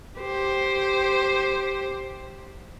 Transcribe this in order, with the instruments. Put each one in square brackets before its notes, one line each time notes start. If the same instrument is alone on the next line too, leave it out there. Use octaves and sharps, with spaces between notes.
[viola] G4 C5